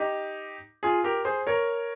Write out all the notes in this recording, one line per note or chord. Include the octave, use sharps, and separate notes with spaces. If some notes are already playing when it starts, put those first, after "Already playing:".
Already playing: D#4 G4
F4 G#4
G4 A#4
G#4 C5
A#4 C#5